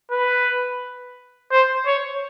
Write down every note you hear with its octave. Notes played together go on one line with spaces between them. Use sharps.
B4
C5
C#5